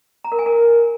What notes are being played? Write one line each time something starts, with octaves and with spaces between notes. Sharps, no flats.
A#5
A#4
G#5
A#4